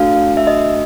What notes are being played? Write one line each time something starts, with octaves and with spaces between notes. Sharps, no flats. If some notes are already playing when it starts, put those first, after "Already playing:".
Already playing: A3 D4 F#4 A4 F5
E5
D#5